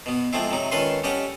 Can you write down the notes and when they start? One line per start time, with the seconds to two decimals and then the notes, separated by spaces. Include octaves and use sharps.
0.06 B2 B3
0.33 F3 G#3 A3 C4 E4
0.51 C3 F#3 D#4
0.71 C#2 D#3 C#4 A4 B4 C6
1.04 G3 C#4 G4 A4 D#5 F#5